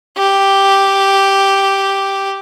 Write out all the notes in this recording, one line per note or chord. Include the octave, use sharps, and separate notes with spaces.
G4